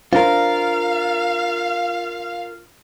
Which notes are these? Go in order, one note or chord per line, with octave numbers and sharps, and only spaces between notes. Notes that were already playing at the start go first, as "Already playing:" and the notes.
D4 F4 A#4 C5 F5